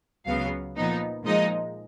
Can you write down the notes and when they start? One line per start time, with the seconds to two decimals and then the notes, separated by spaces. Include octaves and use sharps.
0.26 C#2 C#3 F#3 B3 F5
0.76 A#2 F3 B3 D#4
1.25 A#2 F3 G#3 D#4 D#5